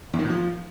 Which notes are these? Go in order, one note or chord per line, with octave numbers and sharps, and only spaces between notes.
E2
D#3
A2
F3